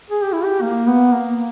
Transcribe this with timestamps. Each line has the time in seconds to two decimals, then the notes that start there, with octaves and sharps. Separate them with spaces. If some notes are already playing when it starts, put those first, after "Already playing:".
0.10 G#4
0.22 G4
0.32 E4
0.44 G4
0.62 A#3
0.87 B3
1.12 A#3